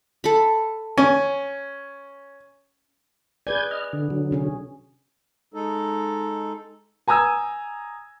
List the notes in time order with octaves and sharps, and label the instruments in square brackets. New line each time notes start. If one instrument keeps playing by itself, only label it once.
[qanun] A4 B5
[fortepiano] C#4 [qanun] G#5
[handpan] G#4 B4 D5 [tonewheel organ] G#5 G6 G#6
[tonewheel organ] D#5 F6
D3
D3 F#3
[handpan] C3 C#4 G#4
[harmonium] G#3 D#4 A4
[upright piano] G#5 A#5 D#6 E6 G#6